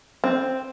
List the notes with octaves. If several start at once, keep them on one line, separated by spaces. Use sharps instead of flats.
C4